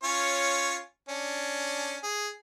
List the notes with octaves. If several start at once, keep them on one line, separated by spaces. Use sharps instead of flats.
C#4 F4 C#5
C#4 D4
G#4